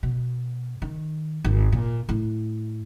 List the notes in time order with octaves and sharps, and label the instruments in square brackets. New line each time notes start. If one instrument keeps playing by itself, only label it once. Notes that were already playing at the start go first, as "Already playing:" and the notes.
[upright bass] B2
D#3
G#1
A#2
A2